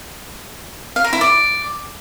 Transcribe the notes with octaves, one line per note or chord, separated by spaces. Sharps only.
F5
A#4
E4
D5